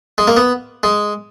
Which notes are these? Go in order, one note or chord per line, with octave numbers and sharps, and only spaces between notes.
G#3
A#3
B3
G#3